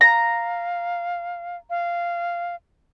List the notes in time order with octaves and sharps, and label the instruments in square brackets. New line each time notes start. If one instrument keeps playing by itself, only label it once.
[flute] F5 [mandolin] A#5
[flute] F5